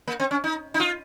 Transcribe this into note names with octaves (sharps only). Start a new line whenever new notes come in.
A#3
C4
C#4
D#4
D#4
F4